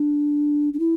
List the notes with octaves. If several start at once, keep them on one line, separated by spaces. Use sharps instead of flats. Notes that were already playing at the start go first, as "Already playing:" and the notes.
Already playing: D4
D4
E4